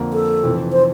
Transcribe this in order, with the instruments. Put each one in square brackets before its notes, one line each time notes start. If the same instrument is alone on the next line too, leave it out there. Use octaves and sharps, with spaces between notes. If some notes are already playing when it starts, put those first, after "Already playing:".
Already playing: [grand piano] F2 D3 F3 A#3
[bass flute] A4
[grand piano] F1 F2 E3
[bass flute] C5